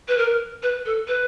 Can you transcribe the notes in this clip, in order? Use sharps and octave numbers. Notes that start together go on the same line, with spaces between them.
B4
A#4
B4
A4
B4